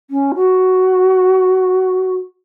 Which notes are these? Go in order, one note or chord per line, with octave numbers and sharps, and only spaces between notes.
C#4
F#4